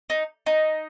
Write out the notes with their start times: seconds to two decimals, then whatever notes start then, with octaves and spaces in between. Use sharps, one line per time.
0.10 D#4
0.46 D#4